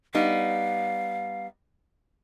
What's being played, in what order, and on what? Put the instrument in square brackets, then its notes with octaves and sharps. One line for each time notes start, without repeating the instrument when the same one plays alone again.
[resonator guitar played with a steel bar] G3 B3 D#4 [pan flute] F5